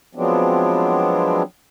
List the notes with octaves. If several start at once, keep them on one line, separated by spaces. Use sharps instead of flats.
F3 F#3 G#3 B3 C4 D4